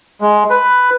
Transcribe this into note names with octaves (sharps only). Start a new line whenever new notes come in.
G#3
B4